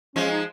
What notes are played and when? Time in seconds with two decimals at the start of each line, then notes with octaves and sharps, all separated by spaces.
0.16 F3 G#3 C#4
0.31 D#4